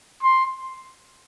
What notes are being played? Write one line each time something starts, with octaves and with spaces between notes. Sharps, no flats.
C6